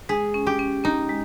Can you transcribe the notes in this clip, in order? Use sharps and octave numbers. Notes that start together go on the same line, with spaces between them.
G#3 G#4
C#4
G4
C#4
C#4 D#4
G#3